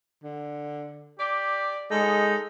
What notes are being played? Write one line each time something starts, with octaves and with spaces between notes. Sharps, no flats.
D3
G4 D5
G#3 D#4 A4